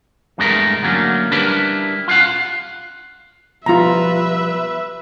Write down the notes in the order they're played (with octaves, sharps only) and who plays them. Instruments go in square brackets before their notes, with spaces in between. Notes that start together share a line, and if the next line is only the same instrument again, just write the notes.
[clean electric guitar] E2 G2 C3 G#3 A3 A#4
D3 F#3 A3 A#3 C#4
G3 D4 E4 G4 A#4 B4
F4 F5 F#5
[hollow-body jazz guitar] B2 F3 G3 [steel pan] F4 A#5 [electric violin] B4 E5